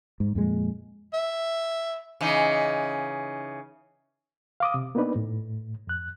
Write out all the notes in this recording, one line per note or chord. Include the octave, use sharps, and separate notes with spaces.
G#2
F2 A#2 G#3
E5
C#3 E3 D#4
F5 D6 D#6
C3
A#3 B3 D4 D#4 B4 D5
A2
F2 F#6